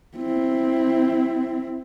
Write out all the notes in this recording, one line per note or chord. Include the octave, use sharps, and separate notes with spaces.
C4 E4